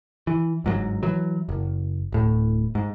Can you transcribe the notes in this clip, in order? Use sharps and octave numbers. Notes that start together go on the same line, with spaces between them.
E3
G1 G#2 D3 F#3
E3 F#3
F#1
D1 A2
G#2